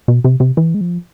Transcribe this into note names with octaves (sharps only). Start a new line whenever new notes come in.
B2
C3
C3
E3
G#3
F3